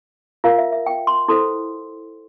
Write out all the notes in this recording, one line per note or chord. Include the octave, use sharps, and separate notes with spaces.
F4 A#4 F5
E5
E5
G5
C6
E4 A4 C5 C6